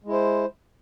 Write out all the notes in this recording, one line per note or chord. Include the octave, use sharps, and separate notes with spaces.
G#3 E4 C5